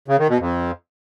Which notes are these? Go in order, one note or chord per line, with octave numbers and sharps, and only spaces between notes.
C#3
D#3
B2
F2